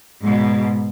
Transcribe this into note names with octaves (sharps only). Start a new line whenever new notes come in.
G#2 B2